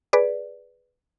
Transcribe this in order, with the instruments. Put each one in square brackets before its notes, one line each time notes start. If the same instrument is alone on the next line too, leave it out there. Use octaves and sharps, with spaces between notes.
[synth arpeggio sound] G#4 B4 D5